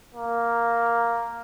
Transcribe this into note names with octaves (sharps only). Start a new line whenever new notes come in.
A#3